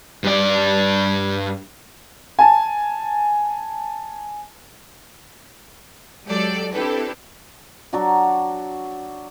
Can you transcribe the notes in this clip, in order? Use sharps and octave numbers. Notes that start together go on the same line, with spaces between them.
G2 D5
G#5 A5
F#3 G#3 G4 A4 D5
C4 D4 E4 G4 A4 B4
F#3 D4 F#4